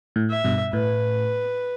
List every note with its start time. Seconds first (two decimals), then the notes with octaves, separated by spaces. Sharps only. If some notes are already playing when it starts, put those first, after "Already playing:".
0.16 A2
0.30 E5
0.44 G2 B2
0.73 A2 B4